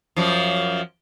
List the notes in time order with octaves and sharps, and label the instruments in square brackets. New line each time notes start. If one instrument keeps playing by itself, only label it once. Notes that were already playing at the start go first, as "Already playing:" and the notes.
[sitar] F#2 F3